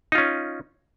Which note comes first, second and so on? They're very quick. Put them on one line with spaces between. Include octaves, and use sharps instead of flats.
D#4 F4 C#4